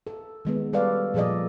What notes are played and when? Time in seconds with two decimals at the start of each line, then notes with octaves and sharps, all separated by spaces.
0.07 A4
0.45 D#3 G#3 B3
0.73 G3 A4 B4 C#5 D5 F5
1.14 A#2 F3 G#4 A4 D5 D#5